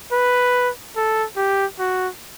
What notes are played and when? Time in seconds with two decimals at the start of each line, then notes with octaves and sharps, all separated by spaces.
0.12 B4
0.96 A4
1.36 G4
1.79 F#4